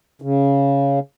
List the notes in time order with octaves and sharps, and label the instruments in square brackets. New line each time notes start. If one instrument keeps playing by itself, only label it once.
[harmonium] C#3